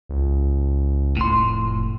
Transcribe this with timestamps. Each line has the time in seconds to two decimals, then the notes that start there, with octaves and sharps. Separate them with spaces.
0.09 C#2
1.17 F1 A2 C6